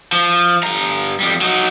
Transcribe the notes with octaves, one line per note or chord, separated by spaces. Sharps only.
F3
G2 A#5
F2 G3
F#3 D#4